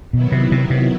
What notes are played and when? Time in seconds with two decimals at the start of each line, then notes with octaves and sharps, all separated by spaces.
0.13 B2 D#3 F#3 B3 E4
0.32 C3
0.52 C3
0.70 C3